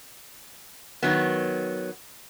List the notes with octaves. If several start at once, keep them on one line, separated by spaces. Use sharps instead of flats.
D#3 F#3 B3